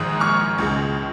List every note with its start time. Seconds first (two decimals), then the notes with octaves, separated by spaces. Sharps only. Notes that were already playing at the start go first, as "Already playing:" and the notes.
Already playing: A#1 G#2 D#3 G#3 D#6 F#6
0.20 C#6 F6
0.58 C#2 C#3 G#3